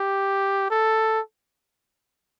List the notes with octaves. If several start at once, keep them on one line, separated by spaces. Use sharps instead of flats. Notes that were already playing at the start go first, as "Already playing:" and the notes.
Already playing: G4
A4